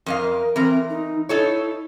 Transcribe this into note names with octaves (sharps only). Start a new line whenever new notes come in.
F2 A#4 D#5 F5
E3 C4 A#4
D#4
D#4 E4 A4 C#5